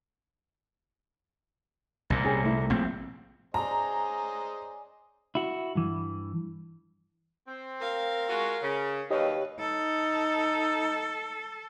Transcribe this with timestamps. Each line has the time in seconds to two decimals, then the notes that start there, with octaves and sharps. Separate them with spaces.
2.10 C2 A#2
2.23 C#4 G4 G#4
2.41 C3 A3 E4
2.70 A#1 A#2 C4
3.54 C#4 G#4 C5 D5 D#5 A#5
5.35 E4 F#4
5.75 G2 E3
7.47 C4
7.80 A#4 F5
8.29 G#3 F4 F#4
8.62 C#3
9.11 D#2 F#3 G4 B4 C#5 D#5
9.59 D#4 A4